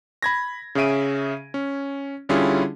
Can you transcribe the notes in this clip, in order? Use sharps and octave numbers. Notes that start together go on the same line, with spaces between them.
B5 G#6 A#6
C#3 C#4 G#4 E5 D7 D#7
C#4
D3 G3 C#4 E4 F4 G#4